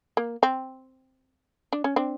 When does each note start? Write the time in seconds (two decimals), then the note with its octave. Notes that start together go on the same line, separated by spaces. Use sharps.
0.17 A#3
0.43 C4
1.73 D4
1.84 C#4
1.96 C4 D4